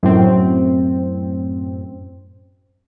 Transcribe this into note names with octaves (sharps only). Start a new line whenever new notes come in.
F#2 A2 C4